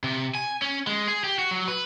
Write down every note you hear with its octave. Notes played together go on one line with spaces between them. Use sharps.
C3
G#5
C#4
G#3
G#4
G4
F#4
F#3
B4